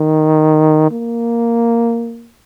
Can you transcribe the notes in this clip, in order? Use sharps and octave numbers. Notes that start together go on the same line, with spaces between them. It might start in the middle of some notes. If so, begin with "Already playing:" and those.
Already playing: D#3
A#3